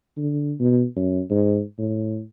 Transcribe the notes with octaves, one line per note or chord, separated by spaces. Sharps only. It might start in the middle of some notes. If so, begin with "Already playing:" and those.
D3
B2
F#2
G#2
A2